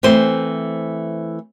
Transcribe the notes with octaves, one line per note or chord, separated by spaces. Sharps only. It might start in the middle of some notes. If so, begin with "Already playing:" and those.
E3 A3 C4 C5